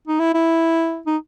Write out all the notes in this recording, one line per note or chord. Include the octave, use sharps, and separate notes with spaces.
D#4
E4
E4
D#4